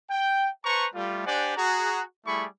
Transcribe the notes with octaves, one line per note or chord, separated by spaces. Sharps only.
G5
B4 C5 A5 A#5 C#6
G3 A3 F4
D4 G4 C5 D5 F#5 G#5
F#4 G#4 A#5
G3 A3 E4 G#4 B5 C#6